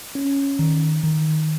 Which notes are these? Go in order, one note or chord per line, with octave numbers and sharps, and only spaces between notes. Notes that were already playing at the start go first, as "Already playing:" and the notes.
C#4
D#3
D#3